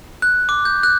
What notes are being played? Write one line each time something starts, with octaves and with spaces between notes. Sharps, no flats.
F#6
D6
G6
F#6